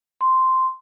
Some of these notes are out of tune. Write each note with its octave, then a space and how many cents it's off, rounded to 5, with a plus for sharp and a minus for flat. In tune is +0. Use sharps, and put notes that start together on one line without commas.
C6 -5